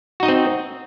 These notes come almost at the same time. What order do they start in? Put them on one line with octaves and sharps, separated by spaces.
F#4 D#4 D#5 C4